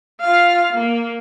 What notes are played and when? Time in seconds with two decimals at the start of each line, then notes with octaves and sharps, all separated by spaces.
0.21 F4 F5
0.73 A#3